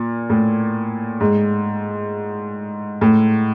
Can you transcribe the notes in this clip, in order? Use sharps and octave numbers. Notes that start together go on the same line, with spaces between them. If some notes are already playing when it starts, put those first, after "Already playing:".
Already playing: A#2
A2
G#2
A2